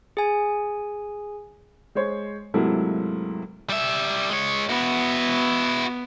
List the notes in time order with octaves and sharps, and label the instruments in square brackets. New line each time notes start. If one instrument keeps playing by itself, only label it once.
[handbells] G#4 G#5
[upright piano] G#3 C5 C#5
G#2 C3 F#3 A3 A#3 E4
[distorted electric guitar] G3 E5
G#3 C#5
[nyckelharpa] B3 [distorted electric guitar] E4 F#4